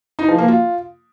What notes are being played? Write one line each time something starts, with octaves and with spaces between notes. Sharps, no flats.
D#4
F3
A#3
F4